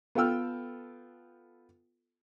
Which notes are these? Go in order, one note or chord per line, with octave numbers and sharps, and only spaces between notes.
B3 F4 A4 G5 E6 F6